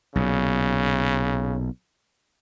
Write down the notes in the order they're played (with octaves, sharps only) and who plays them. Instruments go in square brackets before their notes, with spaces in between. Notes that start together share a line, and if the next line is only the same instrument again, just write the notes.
[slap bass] B1 A#2 [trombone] C#3